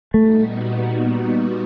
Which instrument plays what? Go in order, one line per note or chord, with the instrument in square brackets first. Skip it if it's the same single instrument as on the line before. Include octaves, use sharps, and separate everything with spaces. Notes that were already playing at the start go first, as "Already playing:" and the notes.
[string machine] A#2 G3 B3 D#4 F#4 [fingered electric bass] A3